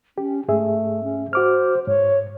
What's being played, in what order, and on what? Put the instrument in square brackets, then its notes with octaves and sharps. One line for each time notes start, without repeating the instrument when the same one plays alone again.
[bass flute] C#4 [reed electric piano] G4
[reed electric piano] G#2 G#4 E5 [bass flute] A3
[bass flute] C#4
[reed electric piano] F#4 D6 F6 [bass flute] C5
[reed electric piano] G#2 [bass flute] C#5